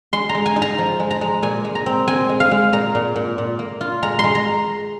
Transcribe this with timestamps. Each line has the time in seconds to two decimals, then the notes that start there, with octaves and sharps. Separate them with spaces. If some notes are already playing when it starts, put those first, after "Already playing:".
0.13 G#3 C6
0.29 A#5
0.35 G#3
0.46 G#5
0.56 D#4
0.62 A#5
0.78 F3
1.00 G#3
1.11 A#5
1.21 G#3
1.42 A#2 G#5
1.65 G#3
1.75 A#5
1.86 C4
2.08 C4 G#5
2.29 G#3
2.40 F5
2.51 G#3
2.73 A#2 A#5
2.95 A#2
3.16 A#2
3.38 A#2
3.59 A#3
3.81 F4
4.02 G#3 A#5
4.19 G#3 C6
4.35 A#5